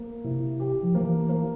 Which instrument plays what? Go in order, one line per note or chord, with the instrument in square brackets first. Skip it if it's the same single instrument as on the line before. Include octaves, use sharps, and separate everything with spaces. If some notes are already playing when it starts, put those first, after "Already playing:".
Already playing: [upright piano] A#3
[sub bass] C3 [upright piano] E4
[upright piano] G4
[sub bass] F3
[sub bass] E3 [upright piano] A#3
[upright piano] A#3